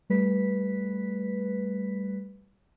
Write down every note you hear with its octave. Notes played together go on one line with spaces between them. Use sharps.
G3 A3 B4 B6